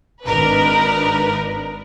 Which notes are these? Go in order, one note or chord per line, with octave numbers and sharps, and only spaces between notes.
G#1 D4 D#4 A#4 B4